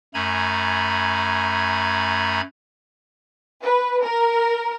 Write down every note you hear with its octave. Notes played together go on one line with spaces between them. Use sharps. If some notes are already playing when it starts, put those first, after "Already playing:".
F#2 A3 G#5 A#5 B5 G#6
B4
A#4